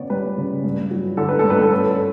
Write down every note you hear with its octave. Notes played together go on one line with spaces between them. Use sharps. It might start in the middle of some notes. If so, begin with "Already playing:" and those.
Already playing: C#3 B3 C#5 D5
G3 B4
C#3
G2
F#3
D3 A4
B4
G2 A4
B4
A4
C#4 B4
A4